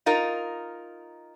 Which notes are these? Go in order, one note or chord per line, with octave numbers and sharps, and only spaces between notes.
D#4 F4 A#4